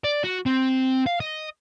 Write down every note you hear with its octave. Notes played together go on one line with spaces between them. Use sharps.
D5
F#4
C4
F5
D#5